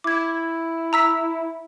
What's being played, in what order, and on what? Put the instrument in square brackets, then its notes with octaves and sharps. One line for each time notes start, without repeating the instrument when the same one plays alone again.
[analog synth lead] E4 [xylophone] D6 G#6
[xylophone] A#5 E6 B6